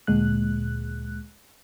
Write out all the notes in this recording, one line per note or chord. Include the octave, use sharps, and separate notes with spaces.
D2 A#2 G#3 F#6